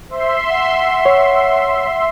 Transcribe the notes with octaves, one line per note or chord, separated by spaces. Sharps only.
C5 E5 C6
F#5
C#5